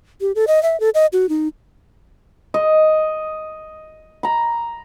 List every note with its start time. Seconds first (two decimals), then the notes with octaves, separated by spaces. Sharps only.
0.21 G4
0.35 A4
0.47 D#5
0.63 E5
0.80 A4
0.95 D#5
1.13 F#4
1.29 D#4
2.54 D#5
4.23 A#5 B5